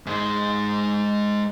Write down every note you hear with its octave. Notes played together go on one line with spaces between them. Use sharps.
G#2 G#3